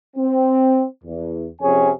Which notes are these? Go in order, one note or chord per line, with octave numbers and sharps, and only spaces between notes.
C4
E2
F2 C3 C#4 G#4 C#5 G#5